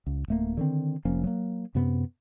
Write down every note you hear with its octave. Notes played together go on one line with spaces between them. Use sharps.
C#2
D1 A3 A#3
D3 D#3 C4
F1 F3 A#3 C#4
F#3 A#3
F#2 C3 B3